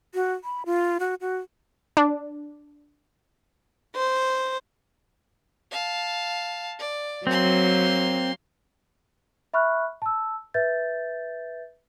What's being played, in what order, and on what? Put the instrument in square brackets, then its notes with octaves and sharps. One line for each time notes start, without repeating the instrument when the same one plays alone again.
[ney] F#4
B5
F4
F#4
F#4
[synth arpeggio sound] D4
[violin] C5
[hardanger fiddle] F5 A5
D5
[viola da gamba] F#3 [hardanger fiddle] A#3 C6 [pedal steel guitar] C4
[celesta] E5 B5 C#6 F6 F#6
A5 E6
B4 E5 G6 A6